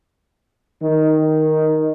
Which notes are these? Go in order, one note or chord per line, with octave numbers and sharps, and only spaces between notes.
D#3 D#4